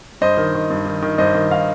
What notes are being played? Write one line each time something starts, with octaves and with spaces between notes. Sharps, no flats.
G2 C5 D#5
D#3
D#3
G2
D#3
D#3
G2 C5 D#5
D#3
D#3 F5